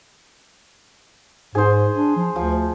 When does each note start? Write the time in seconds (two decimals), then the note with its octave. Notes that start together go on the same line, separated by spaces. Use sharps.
1.55 G#2 G#4 C5
1.95 D4
2.16 F3
2.36 D2 F3